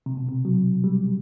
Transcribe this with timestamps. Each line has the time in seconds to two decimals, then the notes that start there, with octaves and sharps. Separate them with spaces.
0.06 C3
0.17 B2
0.28 C3
0.45 F#3
0.84 G3